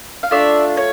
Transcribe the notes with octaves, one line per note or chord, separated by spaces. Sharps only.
F5
A3 D4 F4 D5 E5
C#5